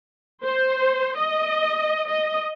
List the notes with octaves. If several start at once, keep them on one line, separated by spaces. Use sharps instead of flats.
C5
D#5
D#5